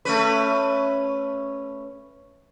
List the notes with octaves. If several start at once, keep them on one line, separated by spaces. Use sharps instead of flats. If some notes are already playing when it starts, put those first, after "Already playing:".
A3 C#4 B4